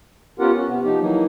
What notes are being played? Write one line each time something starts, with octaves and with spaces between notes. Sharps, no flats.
B3 C#4 F4 G4 A#4 F#5
C#4
C3 B3
F3 D#4 G4
E3 F#3 A#3 D#4